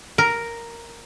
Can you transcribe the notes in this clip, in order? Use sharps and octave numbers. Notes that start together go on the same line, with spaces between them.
A#4